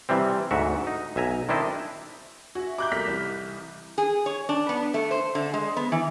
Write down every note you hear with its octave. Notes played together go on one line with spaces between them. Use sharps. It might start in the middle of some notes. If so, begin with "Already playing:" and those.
C3 E3 G3 C4
D2 G#2 F#4 E5
D#4
B1 E5 G#5 A#5
D#3 C4 D4 E4 D#5 A5
F#4 E5 G#5
D#4 G4 B5 D6 F#6 G6
C2 A3 A#3 F6 B6
C2 E3 E7
G#4
C#5
D4
B3
A3
C5
D3
G#3
B3
E3